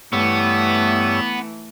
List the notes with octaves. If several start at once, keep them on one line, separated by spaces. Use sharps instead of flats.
G2 E3 A3 B3 C#5 E6